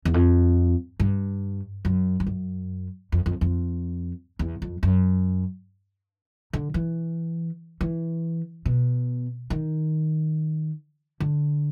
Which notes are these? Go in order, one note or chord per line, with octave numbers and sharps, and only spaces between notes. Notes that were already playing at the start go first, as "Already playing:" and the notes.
E2
F2
G2
F#2
G2
F#2
F2
F2
F2
E2
F2
F#2
D3
E3
E3
B2
D#3
D3